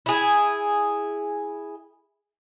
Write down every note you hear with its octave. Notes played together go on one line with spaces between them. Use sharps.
E4 G#4